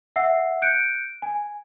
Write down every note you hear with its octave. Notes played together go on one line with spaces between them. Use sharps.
E5 F#5 E6 C7
F#6 G6 C#7 D7
G#5